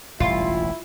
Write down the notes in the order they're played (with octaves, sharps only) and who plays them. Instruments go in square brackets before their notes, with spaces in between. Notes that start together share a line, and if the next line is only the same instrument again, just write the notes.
[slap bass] E1 A1 D2 [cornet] E4 [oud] F4